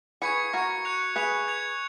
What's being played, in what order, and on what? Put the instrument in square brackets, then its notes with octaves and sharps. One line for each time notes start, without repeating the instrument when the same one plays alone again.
[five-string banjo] G#4 B4 [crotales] C#6 G#6 C#7
[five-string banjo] F#4 A#4 [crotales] C#6 G#6 C#7
[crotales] F#6 C#7 F7
[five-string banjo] G#4 B4 [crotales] F#6 C#7 F7
[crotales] G#6 C#7 F7